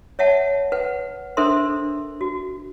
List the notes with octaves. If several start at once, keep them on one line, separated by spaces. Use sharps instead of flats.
C#5 E5 F#5 A5
B4 F#5
D4 A4 A#4 C5 E5 C6
F#4